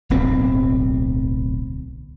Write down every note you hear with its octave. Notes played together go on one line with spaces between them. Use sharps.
D1 B1 C4